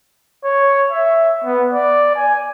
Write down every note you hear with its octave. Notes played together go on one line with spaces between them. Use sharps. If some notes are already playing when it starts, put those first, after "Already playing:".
C#5
E5
B3
D5
G#5